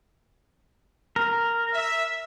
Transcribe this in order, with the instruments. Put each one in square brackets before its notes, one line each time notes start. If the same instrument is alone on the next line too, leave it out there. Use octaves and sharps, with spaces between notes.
[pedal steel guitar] A#4
[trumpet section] E5